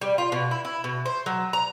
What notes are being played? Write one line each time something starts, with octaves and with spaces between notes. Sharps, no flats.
G3
F4
B2
E4
E4
B2
C5
F#3
A#5